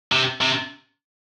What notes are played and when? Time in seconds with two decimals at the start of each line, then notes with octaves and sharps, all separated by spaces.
0.12 C3
0.41 C3